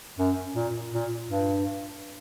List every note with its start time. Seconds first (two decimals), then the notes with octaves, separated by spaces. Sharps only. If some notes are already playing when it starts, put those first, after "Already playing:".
0.19 F#2
0.56 A#2
0.94 A#2
1.31 G2